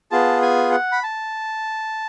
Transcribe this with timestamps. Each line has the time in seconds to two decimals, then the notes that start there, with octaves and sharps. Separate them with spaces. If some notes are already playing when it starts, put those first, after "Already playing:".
0.11 B3 F4 G#4 A5
0.42 G#5
0.72 F#5
0.92 B5
1.03 A5